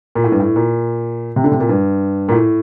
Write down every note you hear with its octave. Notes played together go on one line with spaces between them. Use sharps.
A#2
A2
G2
A2
A#2
C3
D3
C3
A#2
G2
A#2
A2